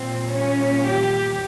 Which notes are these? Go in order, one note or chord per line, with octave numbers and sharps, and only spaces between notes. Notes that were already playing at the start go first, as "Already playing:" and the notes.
Already playing: A#2 G3 C4
C#4
G4